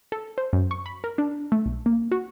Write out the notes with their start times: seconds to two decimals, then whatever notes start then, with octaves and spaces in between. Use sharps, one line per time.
0.12 A4
0.38 C5
0.53 F#2
0.71 C#6
0.86 B5
1.04 A#4
1.18 D4
1.52 A3
1.66 B1
1.86 A#3
2.12 F#4